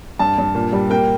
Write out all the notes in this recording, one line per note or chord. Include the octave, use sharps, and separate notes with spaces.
G2 A5
G2
A#2
G3
A#3 G5